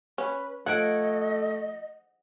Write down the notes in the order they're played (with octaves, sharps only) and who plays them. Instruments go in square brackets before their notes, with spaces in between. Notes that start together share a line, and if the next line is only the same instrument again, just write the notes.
[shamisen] C#4 [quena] B4
[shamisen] F3 [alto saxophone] A3 [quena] D#5 [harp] F#5 G#6 D7